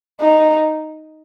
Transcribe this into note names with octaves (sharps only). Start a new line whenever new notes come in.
D#4